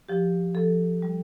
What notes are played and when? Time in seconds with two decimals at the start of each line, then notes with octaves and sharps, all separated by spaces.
0.09 F3 G4
0.55 F3 A4
1.02 G3